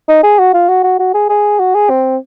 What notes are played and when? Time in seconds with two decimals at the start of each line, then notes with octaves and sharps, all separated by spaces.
0.09 D#4
0.24 G#4
0.39 F#4
0.54 F4
0.69 F#4
0.84 F#4
0.99 F#4
1.14 G#4
1.29 G#4
1.59 F#4
1.74 G#4
1.90 C4